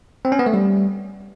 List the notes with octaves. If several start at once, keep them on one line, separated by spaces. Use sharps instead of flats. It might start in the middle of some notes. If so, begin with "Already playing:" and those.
C4
C#4
B3
A3
G3